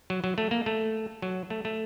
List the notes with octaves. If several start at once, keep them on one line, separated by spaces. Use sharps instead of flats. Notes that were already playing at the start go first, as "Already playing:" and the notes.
F#3
F#3
A3
A#3
A3
F#3
A3
A3